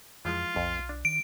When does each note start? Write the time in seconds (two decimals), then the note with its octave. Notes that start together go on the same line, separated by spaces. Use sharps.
0.25 F2 E3 F3 G#3 F4
0.56 B1 F2
0.89 D4
1.05 D#3 D7